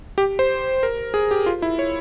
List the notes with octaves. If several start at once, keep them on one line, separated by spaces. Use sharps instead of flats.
G4
C5
A#4
G#4
G4
F4
E4
C#5